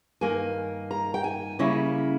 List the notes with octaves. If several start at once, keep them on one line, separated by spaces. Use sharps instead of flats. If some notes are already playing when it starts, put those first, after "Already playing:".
G2 D#3 A#3 G#5
A#5
G5
G#5
C#3 G3 A#3 C#4 E4